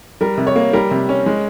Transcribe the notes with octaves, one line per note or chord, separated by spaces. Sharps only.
G3 A#4
C3
C#5
A#3
G3 A#4
C3
C#4
G#3